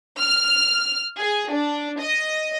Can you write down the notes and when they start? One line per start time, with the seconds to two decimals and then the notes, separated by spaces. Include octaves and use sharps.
0.19 F6
1.18 G#4
1.51 D4
2.00 D#5